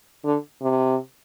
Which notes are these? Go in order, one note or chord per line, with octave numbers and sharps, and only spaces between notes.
D3
C3